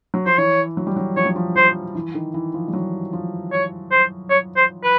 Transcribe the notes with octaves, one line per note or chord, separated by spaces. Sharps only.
F#3
F3 C5
E3 C#5
F#3
G3
F#3
F3 C#5
F#3
F3
F3 C5
E3
D#3
E3
F3
G3
F#3
F3
C#5
C5
C#5
C5
B4